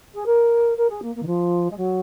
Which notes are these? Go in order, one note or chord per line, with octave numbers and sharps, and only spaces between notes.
G#4
A#4
A#4
G#4
A#3
A#3
D#3
F3
G#3
F#3